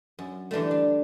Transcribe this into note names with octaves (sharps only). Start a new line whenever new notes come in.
F#2
D3 E3 G3 A3
D4